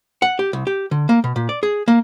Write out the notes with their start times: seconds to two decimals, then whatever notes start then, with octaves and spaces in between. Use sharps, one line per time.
0.22 F#5
0.39 G4
0.53 C2
0.67 G4
0.91 D3
1.09 A#3
1.24 B2
1.36 A#2
1.49 D5
1.63 G#4
1.88 A#3